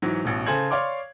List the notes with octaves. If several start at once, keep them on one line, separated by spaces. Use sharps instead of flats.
G#2 E3 F#3
A1 B2
C#3 A4 C5 G#5 G#6 F#7
C#5 D5 F5 C6 D6